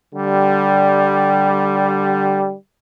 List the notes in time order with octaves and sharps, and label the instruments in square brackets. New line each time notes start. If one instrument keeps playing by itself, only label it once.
[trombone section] D3 G3